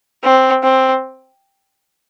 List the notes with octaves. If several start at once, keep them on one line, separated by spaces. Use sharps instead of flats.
C4
C4